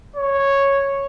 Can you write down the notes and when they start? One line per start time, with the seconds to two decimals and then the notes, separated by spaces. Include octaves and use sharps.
0.16 C#5